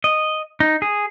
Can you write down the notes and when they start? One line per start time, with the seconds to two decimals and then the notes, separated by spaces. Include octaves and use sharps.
0.04 D#5
0.60 D#4
0.82 G#4